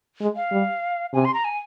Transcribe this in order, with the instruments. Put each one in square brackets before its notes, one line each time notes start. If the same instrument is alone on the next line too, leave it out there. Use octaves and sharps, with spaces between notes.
[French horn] G#3
[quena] F5
[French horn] G3
[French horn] C3 [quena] G#5
[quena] C6
A#5
G#5